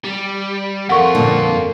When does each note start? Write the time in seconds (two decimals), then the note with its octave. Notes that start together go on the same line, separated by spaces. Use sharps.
0.04 G3
0.89 F2 F4 A4 A#4 F#5 C#6
1.15 G2 A#2 D3